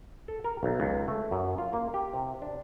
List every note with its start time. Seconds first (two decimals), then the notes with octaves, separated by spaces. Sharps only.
0.28 A4
0.44 A#4
0.63 B1
0.80 C#2
1.08 A3
1.31 F#2
1.58 F4
1.73 A#3
1.94 G4
2.14 C3
2.42 D4